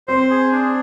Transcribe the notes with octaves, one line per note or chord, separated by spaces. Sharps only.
C4 C5
G#4
D4